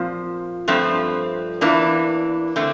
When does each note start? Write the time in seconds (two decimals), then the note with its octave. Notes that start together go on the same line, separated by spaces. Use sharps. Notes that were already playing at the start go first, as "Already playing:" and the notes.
Already playing: A#2 F3 C4
0.68 G2 F3 A3 C4
1.61 E2 E3 A#3 D4
2.56 D3 A3 C4